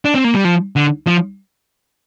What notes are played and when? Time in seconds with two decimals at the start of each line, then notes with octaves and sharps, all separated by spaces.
0.05 D4
0.14 C4
0.24 A#3
0.34 G3
0.45 F3
0.76 D3
1.07 F3